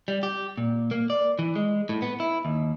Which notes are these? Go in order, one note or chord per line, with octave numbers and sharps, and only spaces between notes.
G3
G4
A#2
A#3
D5
E3
G#3
A2
B3
E4
D#2